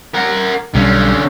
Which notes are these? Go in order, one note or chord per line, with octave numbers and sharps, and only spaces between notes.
A#4 F#5
B1 D3 G3 C#4